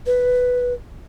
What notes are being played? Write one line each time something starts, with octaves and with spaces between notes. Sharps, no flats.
B4